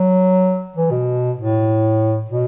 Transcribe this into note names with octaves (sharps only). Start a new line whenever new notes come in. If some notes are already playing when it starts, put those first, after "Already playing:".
Already playing: F#3
E3
B2
A2
B2